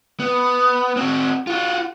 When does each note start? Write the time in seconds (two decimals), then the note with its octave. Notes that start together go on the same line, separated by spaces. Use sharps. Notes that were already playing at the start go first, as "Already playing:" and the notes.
0.20 B3
0.97 C4 F#4
1.47 F4 F#4